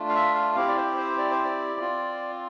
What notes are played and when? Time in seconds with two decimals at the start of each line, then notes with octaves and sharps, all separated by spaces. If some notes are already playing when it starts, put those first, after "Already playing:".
Already playing: A3 D4 F4
0.09 F5
0.15 E5
0.35 F5
0.55 C4 E4 G4 F5
0.68 D5
0.77 C5
0.97 C5
1.18 D5
1.31 C5
1.44 D5
1.80 C4 F4